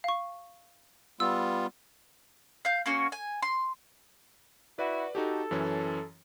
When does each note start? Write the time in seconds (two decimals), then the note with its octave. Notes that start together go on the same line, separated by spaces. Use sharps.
0.04 F5 C#6
1.20 G3 B3 F4 E6
2.65 F5 G6
2.86 A#3 C#4 F#4
3.12 G#5
3.42 C6
4.79 E4 F#4 B4 D5
5.15 D#4 F#4 G4 A4
5.51 F#2 E3 C#4